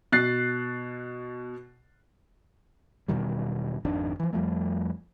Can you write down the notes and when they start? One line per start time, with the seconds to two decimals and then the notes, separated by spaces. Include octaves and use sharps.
0.12 B2 F#6 A6 C7
3.08 E1 B2 D#3 G3
3.85 G#1 F2 D#3 D4
4.20 E3 F3
4.33 F2 F3 G3 A3